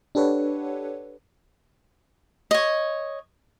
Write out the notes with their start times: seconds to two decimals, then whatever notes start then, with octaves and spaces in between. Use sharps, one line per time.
0.15 D4 G4 A4 B4 C#5 F#5
2.51 C#5 D#5